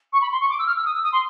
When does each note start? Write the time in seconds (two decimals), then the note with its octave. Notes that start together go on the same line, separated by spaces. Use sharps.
0.12 C#6
0.21 B5
0.31 C6
0.40 C#6
0.49 D6
0.59 E6
0.67 F6
0.76 E6
0.85 D#6
0.94 E6
1.03 D#6
1.12 C6